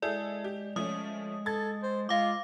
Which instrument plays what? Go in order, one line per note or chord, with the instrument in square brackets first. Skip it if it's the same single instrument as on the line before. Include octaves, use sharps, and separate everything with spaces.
[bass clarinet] G#3 [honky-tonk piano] E4 G#4 A4 [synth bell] D5
[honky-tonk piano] G4
[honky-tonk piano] F3 A3 C#4 [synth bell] D#6
[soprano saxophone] A4 [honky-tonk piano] G#6 A6
[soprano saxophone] C5
[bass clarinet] G#3 [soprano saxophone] F4 [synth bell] F5 D6